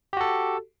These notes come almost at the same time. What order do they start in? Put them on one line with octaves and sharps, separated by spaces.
G4 F#4 A4